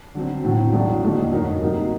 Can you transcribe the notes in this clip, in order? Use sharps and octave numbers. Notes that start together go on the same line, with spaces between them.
D3 F#3 C4
A2 F#3 C4
A1 A2 F#3 A3 D4
D#2 D3 A3 D#4
F#2 F#3 A#3 D#4
C3 F#3 A#3 D#4